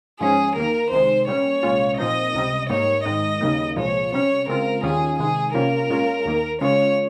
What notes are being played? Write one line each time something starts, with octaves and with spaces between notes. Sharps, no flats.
G#2 F3 G#3 C#4 G#4
D#2 D#3 A#3 A#4
C2 C3 D#3 G#3 C5
A#2 G3 C#4 C#5
C2 A#2 G#3 C#4 F4
A#2 F3 C4 D#4 D#5
C#2 C3 G3
G#2 G3 A#3 D#4 C#5
G#2 D#3 G#3 D#4 D#5
D#2 C#3 G3 A#3 D#4
C2 A#2 F3 G#3 C#5
C3 G3 C#4 C#5
C#3 G#3 C4 F4 A#4
D#2 D#3 G3 C#4 F4 G#4
C3 D#3 G#3 G#4
C3 G3 A#3 C#4 F4 A#4
A#2 G#3 C#4 F4
D#2 D#3 A#3
C#3 G#3 C#4 F4 C#5